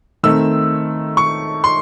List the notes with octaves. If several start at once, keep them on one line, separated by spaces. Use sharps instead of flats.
D#3 A3 C4 E6
C#6
C6